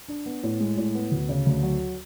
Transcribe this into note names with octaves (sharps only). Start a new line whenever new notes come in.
D4
B3
A2
G#3
A2
B3
D2
C#3
D2
F#3